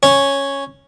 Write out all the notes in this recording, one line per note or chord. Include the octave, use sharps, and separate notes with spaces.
C#4